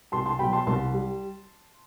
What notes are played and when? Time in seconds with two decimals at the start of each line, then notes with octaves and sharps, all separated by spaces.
0.12 C2 A5 C6
0.26 A5 C6
0.39 B2 F#3 G5 B5
0.53 A5 C6
0.67 C2 A5 C6
0.94 G3